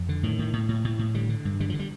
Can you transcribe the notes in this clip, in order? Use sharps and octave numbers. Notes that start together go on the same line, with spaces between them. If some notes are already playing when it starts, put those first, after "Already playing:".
Already playing: F2
D3
A2 D#3
A2
A2
A2
A2
A2
D3 G3
D3
G2
D3 G3
F3
D3
G3